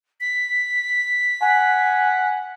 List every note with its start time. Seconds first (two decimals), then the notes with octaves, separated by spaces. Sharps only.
0.21 B6
1.42 F#5 G#5